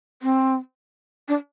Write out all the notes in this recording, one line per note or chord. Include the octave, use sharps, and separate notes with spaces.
C4
D4